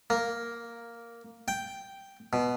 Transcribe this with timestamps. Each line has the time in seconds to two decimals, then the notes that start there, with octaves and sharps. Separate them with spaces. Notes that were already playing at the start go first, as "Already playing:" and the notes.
0.10 A#3
1.48 G5
2.33 B2